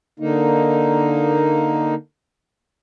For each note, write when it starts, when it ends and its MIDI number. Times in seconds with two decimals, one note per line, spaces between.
0.20 1.95 50
0.20 1.95 58
0.20 1.95 63